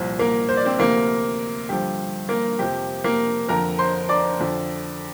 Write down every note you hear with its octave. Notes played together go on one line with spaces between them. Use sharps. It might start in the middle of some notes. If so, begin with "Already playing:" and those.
Already playing: C2 A#2 F3
A#3 A#4
C5
D5
C4 C5
D2 C3 F3 A#3 A#4
G2 D3 F3 G4
A#3 A#4
F2 C3 F3 G4
A#3 A#4
F2 D3 F3 A#4 A#5
C5 C6
D5 D6
F2 D3 F3